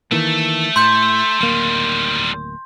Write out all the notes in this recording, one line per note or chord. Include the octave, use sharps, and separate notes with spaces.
D#3 E3 A3 A#3 A4
A2 C6 G6
D1 D#3 G3 A#3